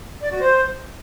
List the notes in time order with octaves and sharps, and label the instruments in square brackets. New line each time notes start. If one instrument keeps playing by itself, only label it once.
[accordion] D5
F#4
C5